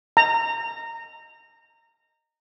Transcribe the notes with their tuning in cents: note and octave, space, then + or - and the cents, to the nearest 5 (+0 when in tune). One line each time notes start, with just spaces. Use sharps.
A#5 -15